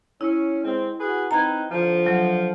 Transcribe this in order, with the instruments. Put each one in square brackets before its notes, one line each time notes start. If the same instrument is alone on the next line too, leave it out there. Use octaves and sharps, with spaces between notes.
[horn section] C#4 [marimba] E4
[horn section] G#3 C4
F#4 G#4 B4
[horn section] C4 D#4 B4 [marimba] A#5 G#6
[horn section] D3 F3
[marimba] F#3